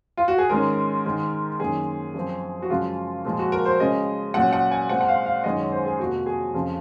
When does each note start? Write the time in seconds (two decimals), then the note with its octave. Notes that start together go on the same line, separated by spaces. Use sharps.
0.17 F4
0.28 F#4
0.38 G#4
0.49 G#2 D#3 G#3 C#4 A#4
1.05 G#2 D#3 G#3
1.60 F#2 D#3 A#3 C#4 G#4
2.14 F#2 F3 C4
2.62 F#4
2.70 F#2 C#3 F3 G#3 F4
3.25 A#2 F3 G#3
3.39 F#4
3.52 A#4
3.65 C5
3.79 C#3 G#3 C#4 D#5
4.34 A#2 F#3 C#4 F#5
4.53 F#5
4.71 G#5
4.89 A#2 G#3 C4 F#5
5.01 F#5
5.08 F5
5.26 F5
5.44 F#2 D#3 G#3 C#4 D#5
5.59 C#5
5.72 C5
5.86 G#4
5.99 F2 C3 F3 A#3 F#4
6.26 G#4
6.54 F2 C#3 F3